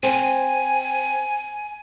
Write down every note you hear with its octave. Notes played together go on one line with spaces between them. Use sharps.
C4 G#5